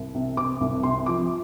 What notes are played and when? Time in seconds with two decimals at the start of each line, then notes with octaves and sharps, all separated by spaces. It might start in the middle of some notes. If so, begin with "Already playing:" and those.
Already playing: C2
0.15 C3
0.37 C3 D6
0.61 C2
0.83 C3 C6
1.06 F3 D6